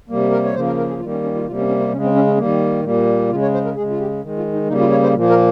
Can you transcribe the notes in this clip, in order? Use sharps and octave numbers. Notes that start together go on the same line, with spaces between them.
C3 G3 A#3
A#4
C#5
C#3 F3 A#3 C5
A#4
A#4
G#4
D#3 G3 A#3 F4
C#4
C#4
F4
C3 G3 A#3 F4
C#4
C#4
C4
C#3 G#3 C#4
C4
C#4
C#4
D#3 G3 A#3
A#2 G3 A#3
C#3 G#3 F4
C#5
C5
A#4
C#3 G#3 G#4
F4
G4
D#3 G#3
F4
D#4
C#3 G3 A#3 D#4
F4
C#5
C5
A#2 F3 A#3
A#4